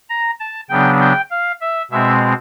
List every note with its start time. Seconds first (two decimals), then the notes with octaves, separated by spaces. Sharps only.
0.10 A#5
0.40 A5
0.69 C#3 F#3 B3 D4 G5
1.00 G5
1.31 F5
1.61 E5
1.91 B2 G#3 C4 E5